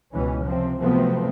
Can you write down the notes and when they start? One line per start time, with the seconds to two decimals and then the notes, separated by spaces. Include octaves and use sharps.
0.14 C#2 B2 E3 C#4
0.46 C3 F3 C4
0.80 C3 F3 F#3 A3 B3 C4